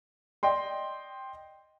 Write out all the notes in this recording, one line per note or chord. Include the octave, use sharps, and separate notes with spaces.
D5 D#5 G5 C6